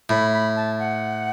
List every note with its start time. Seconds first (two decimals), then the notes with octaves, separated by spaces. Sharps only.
0.09 A2 B5
0.33 B5
0.56 A5
0.80 F#5